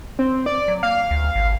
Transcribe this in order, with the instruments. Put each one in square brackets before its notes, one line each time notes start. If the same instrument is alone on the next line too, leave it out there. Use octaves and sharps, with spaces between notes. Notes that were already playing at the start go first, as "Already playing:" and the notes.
[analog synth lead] C4
D5
[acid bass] F#3
[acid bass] A#3 [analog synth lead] F5
[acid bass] D2
G#1